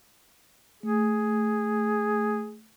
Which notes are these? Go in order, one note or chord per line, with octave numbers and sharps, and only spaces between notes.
A3 G#4